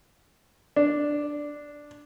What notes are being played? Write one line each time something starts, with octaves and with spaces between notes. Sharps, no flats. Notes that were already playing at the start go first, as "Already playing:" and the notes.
D4